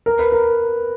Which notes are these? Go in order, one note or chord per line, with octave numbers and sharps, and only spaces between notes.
A#4
B4
A#4